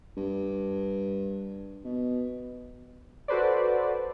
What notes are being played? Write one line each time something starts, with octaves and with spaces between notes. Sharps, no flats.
G2
B2
F#4 A4 B4 C5 D5